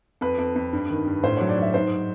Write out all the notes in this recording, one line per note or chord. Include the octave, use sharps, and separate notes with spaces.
F2 B4
F2
F2
G2
D#3
G2
A2 C5
F#3 C#5
D5
F#3 E5
G#2 C5